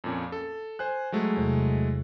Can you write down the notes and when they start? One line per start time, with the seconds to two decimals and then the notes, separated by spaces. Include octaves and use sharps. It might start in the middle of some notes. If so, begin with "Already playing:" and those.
0.04 F2 A#2 C#4
0.32 A4
0.79 C5 G#5 F#6
1.12 F#3 G#3 A3
1.37 E2 C3